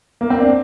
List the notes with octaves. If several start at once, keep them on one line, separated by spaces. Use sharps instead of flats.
A#3
C4
D4